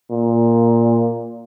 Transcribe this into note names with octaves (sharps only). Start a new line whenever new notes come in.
A#2